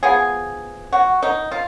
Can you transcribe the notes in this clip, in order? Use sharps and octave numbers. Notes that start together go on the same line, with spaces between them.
F3 B3 G#4
F#4
D#4
F4